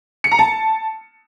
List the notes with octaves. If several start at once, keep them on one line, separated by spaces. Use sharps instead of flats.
C#7
A#5
A5